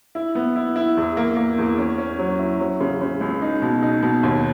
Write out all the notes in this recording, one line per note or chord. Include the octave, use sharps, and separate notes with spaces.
E4
B3
E4
E4
E2
A#3
A#3
E2
C#4
C#4
F#3
E4
F#3
C#3
C#3
C#2
D#4
B2
D#4
B2
D#2